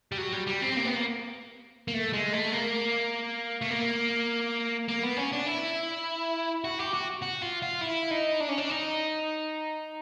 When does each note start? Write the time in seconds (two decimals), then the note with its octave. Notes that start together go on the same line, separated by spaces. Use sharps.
0.12 G3
0.18 F#3
0.32 G3
0.47 G3
0.62 C4
0.77 A#3
0.85 B3
0.95 A#3
1.88 A#3
1.94 A3
2.13 G#3
2.33 A3
2.53 A#3
3.61 A3
3.70 A#3
4.88 A#3
5.02 B3
5.17 C#4
5.32 D4
5.46 E4
6.64 F#4
6.79 G4
6.94 F#4
7.23 F#4
7.42 F4
7.62 F4
7.81 E4
8.11 D#4
8.40 D4
8.49 C#4
8.58 D4
8.70 D#4